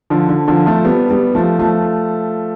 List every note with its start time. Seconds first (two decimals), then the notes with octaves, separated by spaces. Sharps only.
0.10 D3 F3
0.29 D3
0.48 D3 F3
0.66 F3 A3
0.85 G3 B3
1.10 G3 B3
1.35 F3 A3
1.59 F3 A3